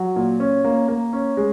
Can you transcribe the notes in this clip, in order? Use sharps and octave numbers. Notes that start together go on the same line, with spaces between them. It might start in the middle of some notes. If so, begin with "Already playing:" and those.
Already playing: F#3
A#2
C#4
A#3
A#3
C#4
G#3